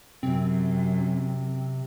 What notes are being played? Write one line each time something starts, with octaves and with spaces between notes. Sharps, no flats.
F#2 C3 C4